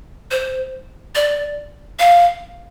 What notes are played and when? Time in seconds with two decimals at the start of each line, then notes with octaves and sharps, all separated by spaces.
0.31 C5
1.15 D5
1.99 F5